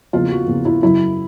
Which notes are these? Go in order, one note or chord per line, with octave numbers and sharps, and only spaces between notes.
E2 C#3 F3 A#3 F4
F#4
E2 C#3 F3 A#3
E4
F#2 C#3 F#3 E4